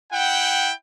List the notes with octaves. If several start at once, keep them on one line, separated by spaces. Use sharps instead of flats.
E4 F#5 G5